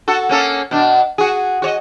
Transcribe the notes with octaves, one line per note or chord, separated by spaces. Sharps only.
F#4 A4
A#3 C#4 A4
B2 D4
F#4 G#4
F#4 C#5 D#5